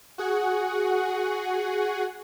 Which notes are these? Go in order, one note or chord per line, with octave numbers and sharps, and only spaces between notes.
F#4 G#4 F#5